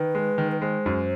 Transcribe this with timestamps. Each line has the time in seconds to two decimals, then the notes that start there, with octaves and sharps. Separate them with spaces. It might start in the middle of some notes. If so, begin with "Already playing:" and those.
Already playing: D#3 B4
0.15 G#3
0.38 D#3
0.52 B4
0.61 G#3 C5
0.86 F#2